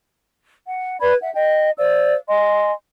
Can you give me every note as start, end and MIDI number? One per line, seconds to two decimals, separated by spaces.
0.66 0.98 78
1.00 1.13 71
1.00 1.13 74
1.00 1.13 83
1.00 1.13 92
1.20 1.32 76
1.20 1.32 78
1.34 1.70 75
1.34 1.70 79
1.78 2.15 72
1.78 2.15 74
1.78 2.15 77
1.78 2.15 88
2.28 2.72 75
2.28 2.72 80
2.28 2.72 84